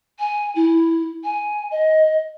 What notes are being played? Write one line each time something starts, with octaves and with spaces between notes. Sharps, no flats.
G#5
E4
G#5
D#5